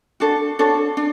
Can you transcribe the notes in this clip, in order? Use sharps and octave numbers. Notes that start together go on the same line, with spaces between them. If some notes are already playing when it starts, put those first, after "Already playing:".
D4 F#4 A4
D4 F#4 A4 C#5
D4